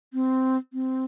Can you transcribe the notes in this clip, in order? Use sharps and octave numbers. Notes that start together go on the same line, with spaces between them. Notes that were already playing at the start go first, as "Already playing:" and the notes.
C4
C4